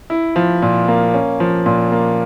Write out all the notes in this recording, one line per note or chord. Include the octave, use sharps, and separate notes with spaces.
E4
F3
A#2
A#3
C#4
F3
A#2
A#3